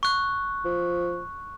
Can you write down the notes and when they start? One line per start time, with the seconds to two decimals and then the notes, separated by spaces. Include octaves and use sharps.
0.03 C#6 F#6
0.65 F3